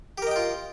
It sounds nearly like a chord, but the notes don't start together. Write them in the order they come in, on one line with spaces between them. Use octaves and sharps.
G4 A#4 D#5 G5 F4